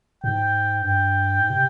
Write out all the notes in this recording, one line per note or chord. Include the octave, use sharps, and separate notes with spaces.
G#2 G5
G2 G5
G#2
C3